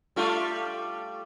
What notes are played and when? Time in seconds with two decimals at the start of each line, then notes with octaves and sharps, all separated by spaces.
0.16 G3 A3 F4